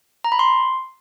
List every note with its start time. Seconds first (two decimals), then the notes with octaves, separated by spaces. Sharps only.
0.24 A#5
0.32 B5
0.39 C6